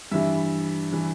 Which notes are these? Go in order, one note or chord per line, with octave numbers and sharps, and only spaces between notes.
G2 E3 G3 E5
E3 G3